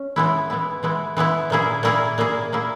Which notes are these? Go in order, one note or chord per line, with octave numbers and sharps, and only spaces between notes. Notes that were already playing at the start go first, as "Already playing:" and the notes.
Already playing: C#4
E3 G#3 B3 E4
E3 G#3 B3 E4
E3 G#3 B3 E4
E3 G#3 B3 E4
A#2 A#3 E4 G#4
A#2 A#3 E4 G#4
A#2 A#3 E4 G#4
A#2 A#3 E4 G#4